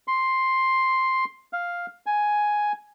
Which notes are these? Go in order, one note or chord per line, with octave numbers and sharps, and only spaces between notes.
C6
F5
G#5